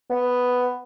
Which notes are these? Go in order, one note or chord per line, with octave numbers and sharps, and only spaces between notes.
B3